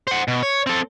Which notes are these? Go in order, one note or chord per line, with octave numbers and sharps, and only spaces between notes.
C5 F#5
B2
C#5
C4 A4